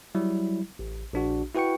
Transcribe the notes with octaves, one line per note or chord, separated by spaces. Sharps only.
F#3 G3 E4
A1
A#1 D4 F#4
E4 F#4 B4 G5 C#6 C#7